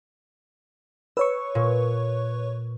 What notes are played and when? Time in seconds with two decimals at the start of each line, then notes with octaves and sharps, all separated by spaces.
1.17 B4 C#5 C#6 E6
1.55 A#2